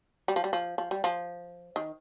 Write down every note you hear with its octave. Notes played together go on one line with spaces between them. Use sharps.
G3
F3
G3
F3
F3
G3
F3
D#3